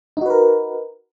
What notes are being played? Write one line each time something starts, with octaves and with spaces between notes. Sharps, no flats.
D#4 F#4 A#4 B4